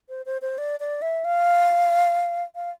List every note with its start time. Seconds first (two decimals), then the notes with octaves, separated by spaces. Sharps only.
0.09 C5
0.26 C5
0.42 C5
0.58 D5
0.80 D5
1.02 E5
1.24 F5
2.55 F5